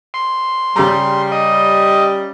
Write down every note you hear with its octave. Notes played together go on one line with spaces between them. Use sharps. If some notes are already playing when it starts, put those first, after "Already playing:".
C6
C#3 G3 G#4 A#5
D#5